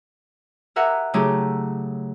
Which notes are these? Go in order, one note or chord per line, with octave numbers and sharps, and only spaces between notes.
G4 A#4 E5 F#5 G#5
C#3 F#3 A3 D#4 G4 G#4